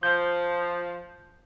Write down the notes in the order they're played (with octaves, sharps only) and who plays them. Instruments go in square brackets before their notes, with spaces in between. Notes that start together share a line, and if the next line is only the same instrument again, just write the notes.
[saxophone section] F3 [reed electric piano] G6